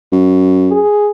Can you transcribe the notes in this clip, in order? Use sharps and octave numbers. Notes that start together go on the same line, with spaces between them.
F#2
G#4